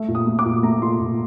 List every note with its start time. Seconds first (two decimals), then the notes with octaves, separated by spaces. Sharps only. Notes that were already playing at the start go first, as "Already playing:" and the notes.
Already playing: A3
0.08 A#2
0.15 D#6
0.27 A3
0.39 D6
0.45 A#2
0.63 A3 A#5
0.82 A#2 C6
1.00 A#2